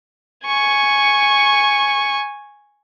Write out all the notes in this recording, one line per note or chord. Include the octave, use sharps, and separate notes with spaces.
G#5 C#6